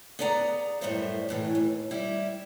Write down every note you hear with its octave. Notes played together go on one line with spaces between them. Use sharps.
B3 G#4 D5 F#5 G5 A#5
F#2 A2 G3 A4 C5 E5
F#2 A2 E3
D#2
G3 E4 G4